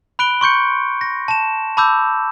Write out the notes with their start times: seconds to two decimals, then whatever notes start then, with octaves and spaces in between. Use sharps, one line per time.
0.19 B5 F#6 D7 G7
0.41 C6 C#6 G6 C#7
1.01 A#6
1.28 A5 E7
1.77 A5 B5 D6 E6 G6